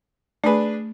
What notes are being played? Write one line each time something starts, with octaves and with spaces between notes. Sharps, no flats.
A3 D4 G#4 B4